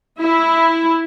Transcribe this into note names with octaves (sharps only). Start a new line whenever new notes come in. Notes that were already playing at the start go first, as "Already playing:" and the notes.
E4